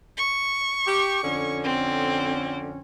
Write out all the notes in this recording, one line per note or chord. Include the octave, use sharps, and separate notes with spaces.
C#6
G4
F2 D3 C#4
C4